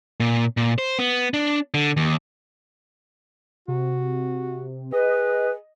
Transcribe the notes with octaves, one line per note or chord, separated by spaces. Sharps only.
A#2
A#2
C5
B3
D4
D3
D#2
C3 F#4
G#4 B4 D#5